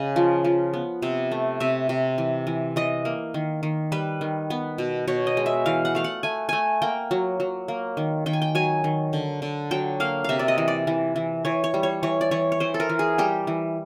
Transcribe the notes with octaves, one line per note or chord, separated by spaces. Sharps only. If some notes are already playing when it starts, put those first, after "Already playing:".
Already playing: C#3 D#5
F3
F3
B3
C3
A3
C3 E5
C3
E3
E3
E3 D#5
A#3
D#3
D#3
G3 B4
D#3
B3
B2
B2 C#5
D#5
G#3
E5
E3 F5
F#5
A3 F5
F#5
A3 G#5
A3 G#5
A#3 G5
F#3
F#3
A#3
D#3
D#3 G5
G#5
G5
F#3 G#5
D#3
D3
D3
F#3 G5
A#3 F5
C3 E5 F5
D5
D#5
E3
D5
E3
E3
E3 C#5
C#5
G3
C#5
E3 C#5
D5
E3 C#5
C#5
E3 C5
A4
A#4
E3
G#4
G3 G4
E3